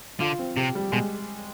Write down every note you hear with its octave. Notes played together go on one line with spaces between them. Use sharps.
D3 F4
C4
C3 G4
G3
B2 G#3